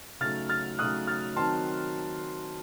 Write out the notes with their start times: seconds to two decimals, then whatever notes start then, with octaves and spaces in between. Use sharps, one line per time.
0.21 C#3 F#3 A3 D#4 F6 A6
0.49 F6 A6
0.79 C#3 F#3 A3 D#4 D#6 F#6
1.08 F6 A6
1.36 D#3 F#3 C4 D#4 A5 C6